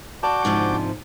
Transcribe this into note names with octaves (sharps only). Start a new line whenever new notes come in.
F#4 D5 A5 D6 G6
G#2 C3 F3 C#4 D4